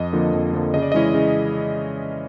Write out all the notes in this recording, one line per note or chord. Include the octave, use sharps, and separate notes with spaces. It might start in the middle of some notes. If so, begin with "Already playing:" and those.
Already playing: F2 D#5
D3 F3 A#3
F2
D3 F3 A#3
C#3 D#5
D5
E3 G#3 C#4 E4 D#5
C#3